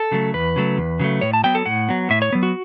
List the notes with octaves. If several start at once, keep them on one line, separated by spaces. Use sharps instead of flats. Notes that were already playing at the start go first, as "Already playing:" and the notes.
Already playing: A4
C#3 F#3 A3
E2 B4
C#3 F#3 A3
E2
C#3 F#3 A3
A2 C#5
A5
F#3 B3 G5
A4
A2 F#5
F#3 B3
A2 E5
C#5
F#3 B3
F#4